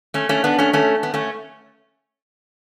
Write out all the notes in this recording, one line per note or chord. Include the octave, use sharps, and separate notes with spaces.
A3 C#4
A3 C#4
B3 D4
A3 C#4
A3 C#4
B3
A3 C#4